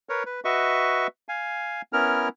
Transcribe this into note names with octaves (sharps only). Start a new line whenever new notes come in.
A#4 B4 C#5
B4
F#4 B4 D#5 E5 C#6
F5 G#5
B3 C#4 E4 A#4 F6